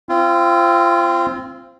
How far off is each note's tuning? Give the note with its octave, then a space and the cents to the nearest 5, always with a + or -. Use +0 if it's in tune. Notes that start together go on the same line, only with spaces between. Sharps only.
C4 +0 F4 -30